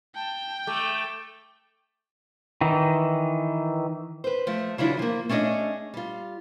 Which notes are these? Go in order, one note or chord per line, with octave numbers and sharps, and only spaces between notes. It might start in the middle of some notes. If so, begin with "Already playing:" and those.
G5 A5
A3 D6
D#3 E3
B4 C5
F3 A3
C#3 E3 F#3 D4 E4 F4
F3 A#3
A3 C#4 D4 F#4 G#4 D#5
G3 F4